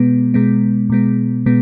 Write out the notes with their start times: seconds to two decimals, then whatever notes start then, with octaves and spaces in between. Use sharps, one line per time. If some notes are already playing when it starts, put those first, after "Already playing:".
Already playing: B2 G#3 B3
0.34 B2 G#3 B3
0.90 B2 G#3 B3
1.46 B2 G#3 B3